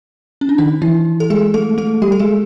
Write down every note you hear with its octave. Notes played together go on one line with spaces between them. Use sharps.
C#4
D4
D#3 D#4
E3 E4
A4
G#3 G#4
A3 A4
A3 A4
G3 G4
A4
G#3 G#4